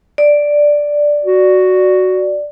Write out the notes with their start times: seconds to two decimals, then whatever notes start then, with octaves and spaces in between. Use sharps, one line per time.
0.18 D5
1.24 F#4